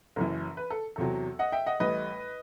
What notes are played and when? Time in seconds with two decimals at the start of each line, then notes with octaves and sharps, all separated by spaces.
0.16 F#1 F#2 E3
0.57 B4
0.70 A4
0.96 E2 C3 F#3 A4
1.39 D#5 F#5
1.52 E5 G5
1.66 D#5 F#5
1.80 A1 A2 G3 B4 D#5